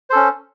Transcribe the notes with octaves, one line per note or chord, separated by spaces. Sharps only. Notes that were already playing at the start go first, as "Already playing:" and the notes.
C#4 A4 C5